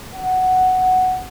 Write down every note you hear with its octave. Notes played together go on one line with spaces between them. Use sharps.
F#5